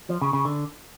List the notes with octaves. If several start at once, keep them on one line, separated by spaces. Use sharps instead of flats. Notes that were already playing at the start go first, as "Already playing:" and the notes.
F3
C#3
C#3
D3